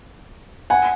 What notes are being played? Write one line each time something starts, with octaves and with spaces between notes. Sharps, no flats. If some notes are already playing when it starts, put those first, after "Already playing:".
F#5 G#5